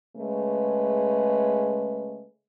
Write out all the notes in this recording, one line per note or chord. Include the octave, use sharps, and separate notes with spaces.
C#3 G#3 A3 B4